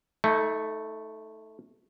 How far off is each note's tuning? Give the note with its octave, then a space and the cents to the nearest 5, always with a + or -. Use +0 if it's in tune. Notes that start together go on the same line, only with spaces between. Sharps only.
A3 +0 D#4 +35